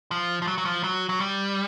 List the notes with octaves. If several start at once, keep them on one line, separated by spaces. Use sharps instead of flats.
F3
F3
F#3
F#3
F3
F#3
F#3
G3